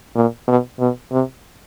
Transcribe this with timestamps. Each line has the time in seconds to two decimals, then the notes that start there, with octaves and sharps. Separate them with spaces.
0.16 A#2
0.48 B2
0.80 B2
1.12 C3